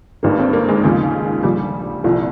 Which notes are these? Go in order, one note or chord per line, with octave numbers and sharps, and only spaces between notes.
G#1 G2 D#3 A#3
C4
A#3
G#3
D#2 C#3 F3 G#3
A#1 A#2 F3 G3
C2 A#2 F3